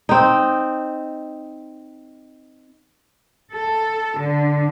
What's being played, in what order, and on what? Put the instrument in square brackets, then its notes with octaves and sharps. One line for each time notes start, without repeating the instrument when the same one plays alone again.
[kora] C4 D#4
[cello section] A4
D3